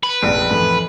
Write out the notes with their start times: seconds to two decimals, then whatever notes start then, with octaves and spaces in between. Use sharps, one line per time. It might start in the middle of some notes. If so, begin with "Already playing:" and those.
0.03 B4
0.21 F1 A#1 D7
0.50 F1 A2 E3